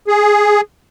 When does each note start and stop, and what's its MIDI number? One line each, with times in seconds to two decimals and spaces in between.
0.08 0.61 68